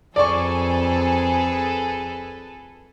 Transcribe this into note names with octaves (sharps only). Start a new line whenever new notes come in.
F2 G#4 A4 B4 D5 C#6